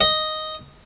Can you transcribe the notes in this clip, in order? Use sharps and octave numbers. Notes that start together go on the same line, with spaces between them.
D#5